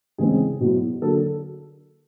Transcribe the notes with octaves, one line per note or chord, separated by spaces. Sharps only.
C#3 E3 G#3 C4 G#4
B2 F#3 B3 E4
D3 F#3 A#3 A4